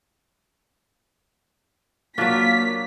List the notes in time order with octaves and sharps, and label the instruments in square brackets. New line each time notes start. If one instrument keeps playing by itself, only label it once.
[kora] F#3 D4 [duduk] A#3 [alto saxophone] F4 [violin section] B6